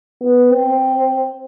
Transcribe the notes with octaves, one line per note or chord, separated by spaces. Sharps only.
B3
C4